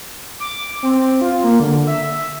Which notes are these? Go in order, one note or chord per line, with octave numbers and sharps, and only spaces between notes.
D6
C4
F4
A#3
D3
E5